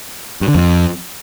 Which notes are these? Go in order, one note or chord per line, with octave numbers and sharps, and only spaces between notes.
G2
D3
F2